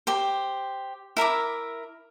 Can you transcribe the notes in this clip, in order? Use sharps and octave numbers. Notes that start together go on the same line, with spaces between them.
G4 C5
E4 A#4 E5 D6